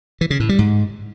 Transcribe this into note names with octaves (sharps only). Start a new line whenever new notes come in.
E3
C#3
A2
G3
G#2